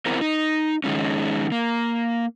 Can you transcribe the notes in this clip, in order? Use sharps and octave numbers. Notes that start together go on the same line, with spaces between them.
B3 C4 E4 A#4 C5
D#4
D#3 G#3 C#4
A#3